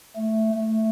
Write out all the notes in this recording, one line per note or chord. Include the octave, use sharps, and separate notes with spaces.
A3
A3